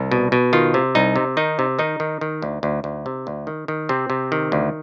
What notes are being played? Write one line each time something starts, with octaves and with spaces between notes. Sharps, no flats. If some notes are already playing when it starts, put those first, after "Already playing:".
Already playing: C2
B2
B2
D#3 F4
C3
C2 D#4
C3
D#3 D#4
C3
D#3 D#4
D#3
D#3
D2
D2
D2
C3
D2
D#3
D#3
C3 C4
C3
D#3
D2